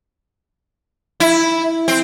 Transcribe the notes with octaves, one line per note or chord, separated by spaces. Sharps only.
E4
C4